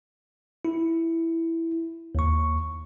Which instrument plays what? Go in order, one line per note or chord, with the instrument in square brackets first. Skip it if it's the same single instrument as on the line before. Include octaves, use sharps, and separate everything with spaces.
[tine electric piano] E4
D#2 C#6